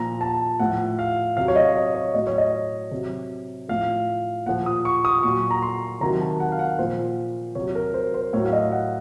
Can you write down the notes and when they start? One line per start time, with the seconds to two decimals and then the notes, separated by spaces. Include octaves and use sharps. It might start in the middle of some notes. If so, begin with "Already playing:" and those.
Already playing: A#2 F3 A#5
0.21 A5
0.60 A2 F3 F#5
0.99 F5
1.37 C3 F#3 F5
1.48 C#5
1.56 D#5
1.76 D#5
1.95 C#5
2.14 A2 F#3 D#5
2.27 C#5
2.38 D#5
2.91 C3 F#3
3.69 A2 F3 F5
4.46 A#2 F3 F#5
4.66 D#6
4.85 C#6
5.05 D#6
5.23 A#2 F#3 C#6
5.51 A#5
5.62 C6
6.01 C3 D#3 F#3 A#5
6.20 A5
6.40 F#5
6.52 F5
6.59 F#5
6.79 A#2 F3 C5
7.55 C3 F#3 C#5
7.75 A#4
7.94 C5
8.14 C5
8.33 A2 C#5
8.37 F#3
8.45 F5
8.53 D#5
8.72 F#5